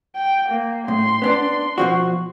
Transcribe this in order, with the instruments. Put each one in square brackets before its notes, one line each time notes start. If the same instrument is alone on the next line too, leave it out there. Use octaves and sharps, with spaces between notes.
[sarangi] G5
A#3
[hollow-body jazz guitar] A2 [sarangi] C6
[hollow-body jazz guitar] B3 C#4 D4
B2 F3 F#4